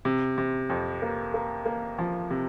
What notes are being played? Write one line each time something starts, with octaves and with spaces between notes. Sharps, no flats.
C3
C3
F2
A#3
A#3
A#3
F3
C3